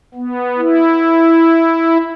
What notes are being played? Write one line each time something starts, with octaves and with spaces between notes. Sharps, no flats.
B3
E4